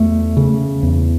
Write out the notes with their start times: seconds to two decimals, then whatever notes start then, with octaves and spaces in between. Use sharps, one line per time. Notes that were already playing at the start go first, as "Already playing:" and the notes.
Already playing: E2 A3
0.37 C#3
0.83 E2